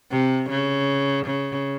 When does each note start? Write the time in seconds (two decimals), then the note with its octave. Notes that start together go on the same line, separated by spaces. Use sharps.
0.12 C3
0.50 C#3
1.26 C#3